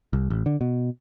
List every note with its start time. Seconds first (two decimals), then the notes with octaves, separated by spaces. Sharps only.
0.13 C2
0.30 A1
0.46 D3
0.61 B2